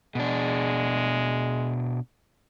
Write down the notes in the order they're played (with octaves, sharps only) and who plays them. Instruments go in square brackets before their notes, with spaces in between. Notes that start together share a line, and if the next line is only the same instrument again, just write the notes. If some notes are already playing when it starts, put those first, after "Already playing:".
[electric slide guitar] B2 D4 [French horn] G#3